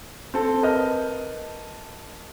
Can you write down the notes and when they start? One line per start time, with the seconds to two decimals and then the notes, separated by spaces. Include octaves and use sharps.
0.34 C4 A4
0.63 A#4 B4 D#5 A5 F6 G6